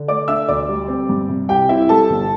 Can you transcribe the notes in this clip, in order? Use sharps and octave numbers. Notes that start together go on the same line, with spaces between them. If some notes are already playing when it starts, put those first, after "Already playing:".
Already playing: D3
A3 D5 D6
D4 E5 E6
D2 D5 D6
G3
C4
G2
C3
C2 G4 G5
C4 E4 E5
G3 A4 A5
G1